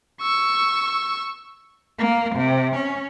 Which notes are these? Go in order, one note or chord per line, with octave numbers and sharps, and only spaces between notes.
C#6 E6
A#3
C3
C#4